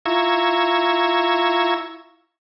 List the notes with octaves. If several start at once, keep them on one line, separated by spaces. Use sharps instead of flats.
E4 F4 A#5 C#6 E6 G#6